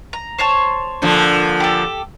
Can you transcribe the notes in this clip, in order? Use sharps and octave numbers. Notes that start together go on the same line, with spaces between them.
A#5
C5 C#5 A5
A#2 D3 F3
G4 A4